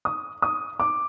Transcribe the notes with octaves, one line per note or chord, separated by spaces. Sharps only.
D#6
D#6
D6